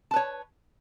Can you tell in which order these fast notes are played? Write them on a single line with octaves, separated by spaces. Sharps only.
A5 B4 C#5